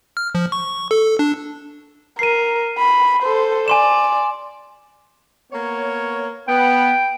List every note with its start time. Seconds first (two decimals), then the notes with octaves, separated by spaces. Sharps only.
0.17 F6
0.35 F3
0.52 C#6
0.91 A4
1.19 D4
2.19 A#4 C7 D#7
2.78 B5
3.23 A4 C5
3.68 D5 G#5 C6 E7
5.51 A#3 B3 C#5
6.48 B3 G5